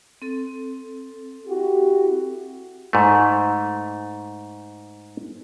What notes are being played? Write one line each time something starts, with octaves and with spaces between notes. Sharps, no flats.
C4 A4
E4 F#4 G4
G#2 A3